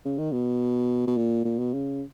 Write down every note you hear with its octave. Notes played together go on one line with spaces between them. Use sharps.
C#3
D#3
B2
B2
A#2
A#2
B2
C#3